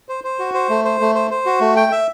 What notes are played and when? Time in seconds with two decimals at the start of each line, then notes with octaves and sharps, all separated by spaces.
0.09 C5
0.24 C5
0.39 F#4
0.54 C5
0.69 A3
0.85 C5
1.01 A3
1.15 C5
1.31 C5
1.46 F#4
1.61 A3
1.76 G5
1.92 E5